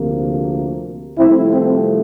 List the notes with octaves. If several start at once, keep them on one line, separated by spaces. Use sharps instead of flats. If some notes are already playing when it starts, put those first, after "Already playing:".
Already playing: D2 C3 F3 A#3
C2 C3 F3 A3 C4 E4
C4